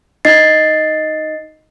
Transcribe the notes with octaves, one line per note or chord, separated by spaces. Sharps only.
D#4 D#5 A6 C7